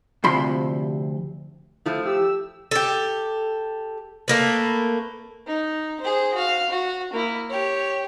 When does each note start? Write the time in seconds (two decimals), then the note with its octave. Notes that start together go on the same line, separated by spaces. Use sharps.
0.24 D2 C3 F3 B5 C6
1.86 F3 A3 E4
2.05 G4 E6
2.71 G4 A4
4.28 A3 A#3 B4
5.47 D#4
6.00 G#4 C5
6.34 F#4 F5
6.70 F#4
7.13 A#3 E4
7.50 G4 C#5